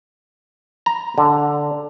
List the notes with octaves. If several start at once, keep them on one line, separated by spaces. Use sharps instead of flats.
A#5
D3